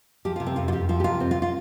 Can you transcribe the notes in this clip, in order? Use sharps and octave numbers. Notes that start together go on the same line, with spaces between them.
F3 G4
C3 F4
C4
F2 F4
F4
F2 G4
F3 F4
G4
C3 F4
F2 C4
F4
F4